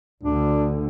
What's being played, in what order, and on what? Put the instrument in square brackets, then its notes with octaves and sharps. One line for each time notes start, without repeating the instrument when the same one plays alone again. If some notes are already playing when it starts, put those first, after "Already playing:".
[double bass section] D2 D3 [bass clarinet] D4